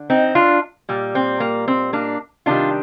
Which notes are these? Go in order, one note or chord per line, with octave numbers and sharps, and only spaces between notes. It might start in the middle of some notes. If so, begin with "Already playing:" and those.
Already playing: D3
C4 D#4
D4 F4
A#2 G3
C4
A#3
C4
A#3 D4
C3 D#3 G3 D4 F4